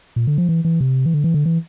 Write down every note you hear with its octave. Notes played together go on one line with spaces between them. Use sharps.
A#2
D3
F3
E3
E3
C3
E3
D3
E3
D3
E3